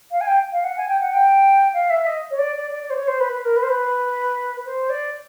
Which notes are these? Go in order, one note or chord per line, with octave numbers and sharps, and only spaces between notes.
F5
G#5
G5
F5
F#5
G#5
G5
F#5
G5
F5
E5
D#5
C#5
D5
D5
D5
D5
C5
C#5
C5
B4
B4
A#4
B4
C5
B4
C5
D5